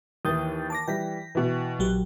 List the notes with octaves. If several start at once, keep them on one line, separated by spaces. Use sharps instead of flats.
D#2 E3 D#6 G6 A6
A5 D6 A#6
E3 G3 G5 A#6 B6
B2 E3
A#1 F#3 G4